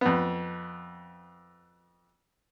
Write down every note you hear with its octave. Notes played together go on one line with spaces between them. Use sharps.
F2 B3